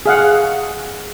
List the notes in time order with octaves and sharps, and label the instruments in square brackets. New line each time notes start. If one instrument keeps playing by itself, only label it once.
[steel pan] G#4 F5 F#5